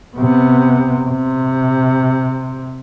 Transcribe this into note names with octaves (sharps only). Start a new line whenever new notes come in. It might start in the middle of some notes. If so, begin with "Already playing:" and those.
C3 B3
C3